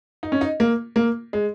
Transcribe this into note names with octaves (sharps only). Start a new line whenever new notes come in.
D#4
C#4
D#4
A#3
A#3
G#3